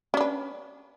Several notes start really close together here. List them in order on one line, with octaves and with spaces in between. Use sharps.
C#4 D4 B4